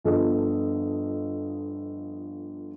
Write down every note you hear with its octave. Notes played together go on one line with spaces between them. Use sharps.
G1 F3 A4 D#5